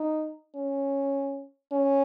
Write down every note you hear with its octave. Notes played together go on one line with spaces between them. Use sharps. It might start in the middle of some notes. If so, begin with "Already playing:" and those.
Already playing: D#4
C#4
C#4